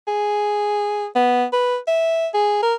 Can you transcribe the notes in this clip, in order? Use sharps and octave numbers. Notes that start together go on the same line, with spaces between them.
G#4
B3
B4
E5
G#4
A#4